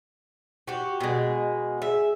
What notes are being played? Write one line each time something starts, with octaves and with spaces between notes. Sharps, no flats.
F#4 G4
B2 G#3
G#4 E5